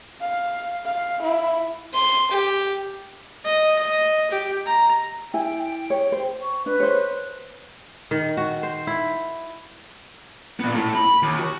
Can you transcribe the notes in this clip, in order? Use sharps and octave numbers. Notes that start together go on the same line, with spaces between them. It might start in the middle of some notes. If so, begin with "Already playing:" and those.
F5
F5
E4
C6
G4
D#5
D#5
G4
A#5
E4 G5 G#5
C#5
C5
C#6
D4 B4
C5 C#5
D#3
F#4
C5
E4
A#2 B3
A3 E4
B5
D#2
F#4